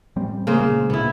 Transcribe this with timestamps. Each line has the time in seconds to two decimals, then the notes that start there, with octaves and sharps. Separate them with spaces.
0.16 A1 G3 C4
0.47 C#3 A#3 C5
0.60 A#2 G#3
0.90 D2 A#2 B3 E4